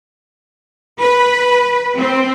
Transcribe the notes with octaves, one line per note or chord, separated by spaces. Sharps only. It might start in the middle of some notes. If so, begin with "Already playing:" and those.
B4
C4